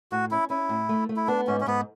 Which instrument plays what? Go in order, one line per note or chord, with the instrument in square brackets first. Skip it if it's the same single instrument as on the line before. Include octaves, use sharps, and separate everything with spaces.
[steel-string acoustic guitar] A2 [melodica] F#4
[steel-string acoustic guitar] C#4 [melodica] E4
[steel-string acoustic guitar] C#4 [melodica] E4
[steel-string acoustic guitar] A2
A3
A3
[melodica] E4
[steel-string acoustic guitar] B3 [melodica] D4
[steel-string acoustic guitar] G#2 [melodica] C#4
[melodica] C#4
[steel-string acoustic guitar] G#2 [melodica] B3